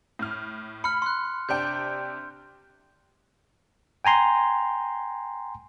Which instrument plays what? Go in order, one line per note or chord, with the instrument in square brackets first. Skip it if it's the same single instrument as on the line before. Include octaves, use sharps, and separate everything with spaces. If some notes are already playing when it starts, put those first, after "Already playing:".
[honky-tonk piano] A2 F6
[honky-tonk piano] B5 [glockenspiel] F6 C#7
[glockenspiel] C6 F#6
[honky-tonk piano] C3 D4 G5 [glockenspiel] G6
[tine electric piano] G5 G#5 A#5 C6